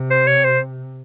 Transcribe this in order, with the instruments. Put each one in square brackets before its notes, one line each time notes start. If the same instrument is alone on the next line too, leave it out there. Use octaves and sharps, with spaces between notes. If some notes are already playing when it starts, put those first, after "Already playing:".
Already playing: [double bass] C3
[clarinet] C5
C#5
C5